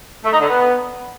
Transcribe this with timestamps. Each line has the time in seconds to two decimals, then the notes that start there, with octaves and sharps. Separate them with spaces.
0.24 A3
0.32 D#4
0.40 D3
0.48 B3